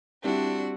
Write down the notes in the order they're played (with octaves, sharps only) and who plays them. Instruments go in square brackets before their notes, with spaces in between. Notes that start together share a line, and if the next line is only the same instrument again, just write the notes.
[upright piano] G3 C4 E4 [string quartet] D4 F#4